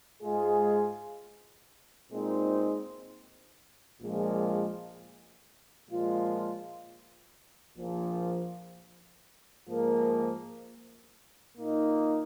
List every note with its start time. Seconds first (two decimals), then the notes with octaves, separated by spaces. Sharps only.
0.23 G#2 G#3 F4 G#4
2.11 A#2 G#3 C4 D#4 C5
4.01 A#1 A#2 F3 G#3
5.89 A#2 F3 G#3 F4
7.78 A#1 A#2 F3
9.68 G#2 F3 A#3
11.57 A#2 A#3 D#4